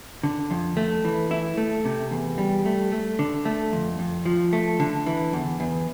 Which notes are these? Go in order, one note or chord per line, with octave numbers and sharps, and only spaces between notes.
D3
F2
A3
E3
E4
A3
C3
E2
G3
A3
A3
D3
A3
F2
F2
F3
A3
D3
E3
E2
E2